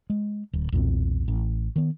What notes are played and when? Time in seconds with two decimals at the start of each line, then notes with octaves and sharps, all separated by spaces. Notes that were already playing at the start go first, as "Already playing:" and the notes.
0.10 G#3
0.53 D1
0.72 B1 E2 A#2 C4
1.28 A1
1.76 D#3 B3